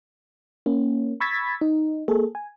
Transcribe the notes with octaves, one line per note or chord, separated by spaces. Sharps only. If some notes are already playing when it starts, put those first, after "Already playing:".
A#3 C#4
B5 C#6 E6 G#6 A6 B6
D#4
A#3 G#4 A4
G#5